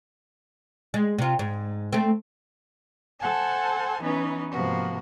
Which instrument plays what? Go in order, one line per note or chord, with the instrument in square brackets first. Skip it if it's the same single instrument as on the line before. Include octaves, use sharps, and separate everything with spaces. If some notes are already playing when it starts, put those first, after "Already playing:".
[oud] G#3
C3 F4
G#2
A3 C4
[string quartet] A4 C5 F#5 G#5 A5
E3 B3 C#4 D#4 B4
G#2 C3 F3 A#3 B3 F#4